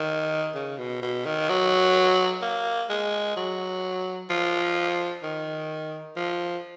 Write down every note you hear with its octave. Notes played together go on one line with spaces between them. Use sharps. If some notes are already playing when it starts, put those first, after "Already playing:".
Already playing: D#3
C#3
B2
B2
D#3
F#3
A#3
G#3
F#3
F3
D#3
F3